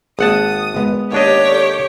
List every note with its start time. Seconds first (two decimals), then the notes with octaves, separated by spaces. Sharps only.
0.19 G#1 A#3 G#4 F#5 A5 D#6
0.74 G#3 B3
1.12 D#2 D4 G4 C#5 D#5 D6
1.48 A4 D5